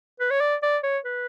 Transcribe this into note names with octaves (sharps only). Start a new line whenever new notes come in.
B4
C#5
D5
D5
C#5
B4